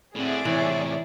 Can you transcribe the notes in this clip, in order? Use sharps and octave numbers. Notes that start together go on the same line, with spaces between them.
A2 C4 F#4 G#4 D5 E5
A2 C3 E3 C#5